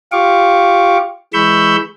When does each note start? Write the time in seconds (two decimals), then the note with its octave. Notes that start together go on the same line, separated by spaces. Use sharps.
0.12 F4 G4 F5 C#6 D6
1.34 E3 G#3 B5 C#6 E6 G6